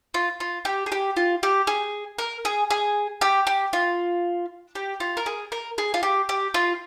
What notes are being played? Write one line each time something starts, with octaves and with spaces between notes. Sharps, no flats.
F4
F4
G4
G#4
G4
F4
G4
G#4
A#4
G#4
G#4
G4
G4
F4
G4
F4
A#4
G#4
A#4
G#4
F4
G4
G4
F4